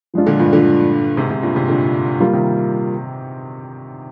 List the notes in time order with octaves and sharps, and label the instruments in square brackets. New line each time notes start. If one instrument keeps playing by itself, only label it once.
[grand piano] F3 G#3 D4 F4
[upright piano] A#2 D3
G2 A#2
A#2 D3
G#2 C3
G#2 C3
G2 A#2
G#2 C3
A#2 D3
[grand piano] G3 A#3 F4
[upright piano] C3 D#3